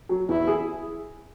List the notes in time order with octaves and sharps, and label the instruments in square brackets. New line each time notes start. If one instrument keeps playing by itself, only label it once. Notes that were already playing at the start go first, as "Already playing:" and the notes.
[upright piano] F#3
[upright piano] E2 [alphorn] E4
[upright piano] G#4